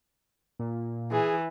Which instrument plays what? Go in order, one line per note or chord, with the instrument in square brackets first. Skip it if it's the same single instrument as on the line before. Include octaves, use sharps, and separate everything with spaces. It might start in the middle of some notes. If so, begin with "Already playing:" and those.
[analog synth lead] A#2
[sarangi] E3 [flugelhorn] G#4